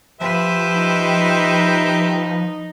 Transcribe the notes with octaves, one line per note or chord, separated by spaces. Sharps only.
F3 G4 B4 C5 E5
D#4